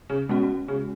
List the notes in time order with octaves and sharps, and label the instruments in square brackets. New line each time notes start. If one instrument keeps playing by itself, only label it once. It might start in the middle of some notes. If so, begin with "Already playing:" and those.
[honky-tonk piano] C#3
[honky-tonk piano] B2 [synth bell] G#3 C#4 F#4
[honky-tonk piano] C#3